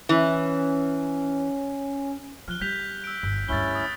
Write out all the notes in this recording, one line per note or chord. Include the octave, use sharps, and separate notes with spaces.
E3 C#4
F3 F6 F#6 G7
G3 G6 B6 F7
E6 D7
G1
D2 G2 C#4 E4 A6 G7
D#6 A6